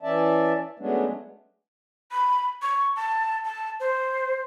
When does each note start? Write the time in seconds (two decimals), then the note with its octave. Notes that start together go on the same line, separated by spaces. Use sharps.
0.03 E3 C#4 D5 E5 A5
0.79 F#3 G#3 A3 B3 C#4 D4
2.11 B5
2.62 C#6
2.96 A5
3.45 A5
3.80 C5